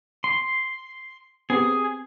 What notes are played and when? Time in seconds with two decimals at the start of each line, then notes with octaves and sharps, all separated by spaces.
0.24 C6
1.50 B3 C4 G4 G#4